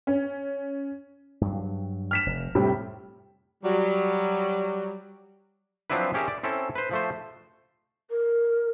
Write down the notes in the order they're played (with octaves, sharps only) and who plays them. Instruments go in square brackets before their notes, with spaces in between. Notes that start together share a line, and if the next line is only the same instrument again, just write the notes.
[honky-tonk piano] C#4
[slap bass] G2 F#3
[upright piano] F6 B6 E7
[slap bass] F1
[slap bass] F2 [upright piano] A2 C3 G3
[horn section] F#3 G3
[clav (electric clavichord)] F3 F#3 C4 D4 E4 B4
C#4 G4 G#4 A#4 E5
D5
C4 C#4 E4 A4
B4 C5
F3 A3 C5
[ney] A#4